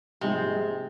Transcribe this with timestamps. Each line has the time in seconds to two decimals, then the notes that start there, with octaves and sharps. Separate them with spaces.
0.21 A#1 G#2 C3 G#3 D#4 G#4